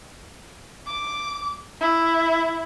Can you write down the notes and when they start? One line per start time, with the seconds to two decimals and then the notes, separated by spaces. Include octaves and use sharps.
0.87 D6
1.80 E4